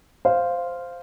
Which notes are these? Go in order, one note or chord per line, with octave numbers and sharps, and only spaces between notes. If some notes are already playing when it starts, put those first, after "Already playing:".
C5 F5